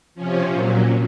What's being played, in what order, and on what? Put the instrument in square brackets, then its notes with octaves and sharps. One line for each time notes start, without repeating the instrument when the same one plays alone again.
[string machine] C3 F3 C#4
A#2 F#3